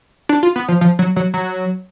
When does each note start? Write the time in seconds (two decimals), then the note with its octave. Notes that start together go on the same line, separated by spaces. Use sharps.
0.29 D4
0.43 F4
0.56 B3
0.68 F3
0.81 F3
0.99 F#3
1.16 F#3
1.34 F#3